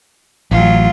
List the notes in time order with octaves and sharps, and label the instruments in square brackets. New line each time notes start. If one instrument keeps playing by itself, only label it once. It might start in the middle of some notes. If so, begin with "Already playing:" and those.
[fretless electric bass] A1 [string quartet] F#3 F4